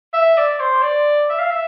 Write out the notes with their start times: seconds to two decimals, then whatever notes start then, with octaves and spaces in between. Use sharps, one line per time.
0.13 E5
0.37 D5
0.60 C5
0.82 D5
1.30 E5
1.39 F5
1.50 E5